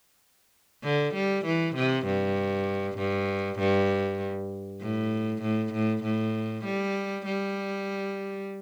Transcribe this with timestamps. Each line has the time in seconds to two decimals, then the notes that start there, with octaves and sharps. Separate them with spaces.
0.84 D3
1.14 G3
1.45 E3
1.75 C3
2.06 G2
2.98 G2
3.59 G2
4.81 A2
5.42 A2
5.73 A2
6.04 A2
6.65 G3
7.26 G3